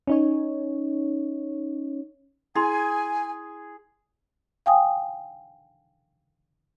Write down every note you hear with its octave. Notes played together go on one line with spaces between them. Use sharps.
C#4 D#4 C#5
E4 G#4 G#5 C6
F5 G5 G#5 D#6